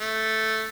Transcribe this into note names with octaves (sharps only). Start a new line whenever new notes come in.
A3